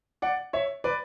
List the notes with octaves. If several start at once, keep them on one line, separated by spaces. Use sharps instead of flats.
D5 F#5
C#5 E5
B4 D5